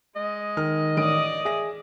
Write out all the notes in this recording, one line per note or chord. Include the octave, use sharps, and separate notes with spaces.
G#3 D#5
D#3 F6
A1 D5 D#6 D7
G#4 E5 A#6